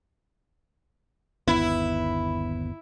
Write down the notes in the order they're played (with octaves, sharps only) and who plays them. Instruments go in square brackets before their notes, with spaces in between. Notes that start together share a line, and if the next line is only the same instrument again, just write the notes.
[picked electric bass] G1 D#2 B3 [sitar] E4